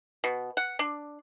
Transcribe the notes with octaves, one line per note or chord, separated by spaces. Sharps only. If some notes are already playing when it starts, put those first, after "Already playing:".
B2
F#5
D4